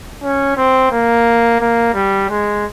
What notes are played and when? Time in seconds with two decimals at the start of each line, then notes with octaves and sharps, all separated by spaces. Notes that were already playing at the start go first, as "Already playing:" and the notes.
0.22 C#4
0.56 C4
0.91 A#3
1.60 A#3
1.94 G3
2.29 G#3